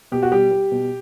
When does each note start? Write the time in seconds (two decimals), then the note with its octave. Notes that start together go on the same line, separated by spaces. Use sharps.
0.12 B2 G4
0.23 F#4
0.32 G3 G4
0.51 G3
0.72 B2